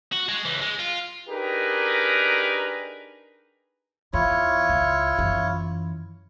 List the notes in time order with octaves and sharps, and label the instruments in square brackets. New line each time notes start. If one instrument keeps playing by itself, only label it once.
[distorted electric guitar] F#4
G#3
C#2 E3
G#3
F4
[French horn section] D4 D#4 G4 G#4 A#4 B4
[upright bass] E2 [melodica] E4 F4 C#5
[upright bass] C#2
F#2 E3